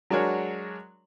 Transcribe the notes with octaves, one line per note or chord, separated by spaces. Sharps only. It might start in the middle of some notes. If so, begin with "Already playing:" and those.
F#3 G#3 D4 F#4 A#4 C#5